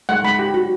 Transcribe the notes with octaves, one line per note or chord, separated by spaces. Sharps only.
G#3 F#5
G#3 B5
G4
F#4